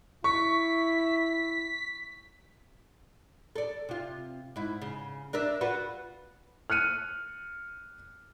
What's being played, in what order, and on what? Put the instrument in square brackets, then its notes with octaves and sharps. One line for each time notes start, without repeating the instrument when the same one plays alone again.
[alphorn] E4 [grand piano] C#6 [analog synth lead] B6
[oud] A4 D5
C3 F4
G#2 E4
C#3
D4 A#4 E5
F4 F#4 B4
[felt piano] F6 F#6 C#7 D#7